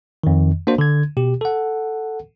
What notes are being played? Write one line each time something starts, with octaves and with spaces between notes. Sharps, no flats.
F2 D#3
A#3 D4 F#4 C5
D3 G#6
B2 G4
A4 F#5